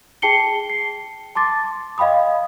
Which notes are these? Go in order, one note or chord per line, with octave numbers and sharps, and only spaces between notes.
G#4 G5 A5 C7 C#7 G7
C7
A5 C6 D6 A6
D#5 F5 G5 B5 D#6